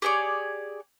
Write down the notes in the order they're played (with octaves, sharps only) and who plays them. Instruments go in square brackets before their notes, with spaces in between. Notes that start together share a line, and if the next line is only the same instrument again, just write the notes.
[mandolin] G4 G#4 C#5 D5